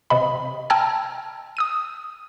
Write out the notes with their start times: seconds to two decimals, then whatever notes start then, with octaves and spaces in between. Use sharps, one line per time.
0.10 C3 D#5 B5
0.70 G5 A5 A#5 E6 F6 G#6
1.57 D#6 E6 D#7